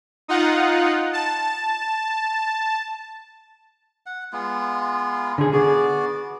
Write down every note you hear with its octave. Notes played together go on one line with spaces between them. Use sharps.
D#4 F4 F#5
A5
F#5
G#3 B3 F4
D3 G#4
B3 F#4 G#4 D5